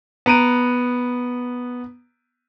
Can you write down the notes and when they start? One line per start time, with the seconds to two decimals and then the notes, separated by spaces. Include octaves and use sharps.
0.26 B3 A#5 D7 D#7